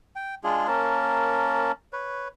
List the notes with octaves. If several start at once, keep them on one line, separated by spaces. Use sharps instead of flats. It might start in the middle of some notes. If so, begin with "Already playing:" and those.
G5
G#3 D4 F4 G#4
A#3 C#4 A#4 A5
B4 C#5